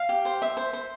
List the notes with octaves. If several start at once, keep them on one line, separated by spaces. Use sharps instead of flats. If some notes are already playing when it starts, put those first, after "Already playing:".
Already playing: F5
G4
C5
E5
C5
C5